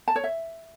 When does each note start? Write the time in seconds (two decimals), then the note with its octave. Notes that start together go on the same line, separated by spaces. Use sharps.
0.08 A5
0.16 C#5
0.24 E5